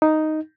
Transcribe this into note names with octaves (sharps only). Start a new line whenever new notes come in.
D#4